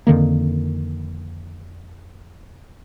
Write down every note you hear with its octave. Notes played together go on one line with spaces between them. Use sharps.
F2 D3 D#3 A#3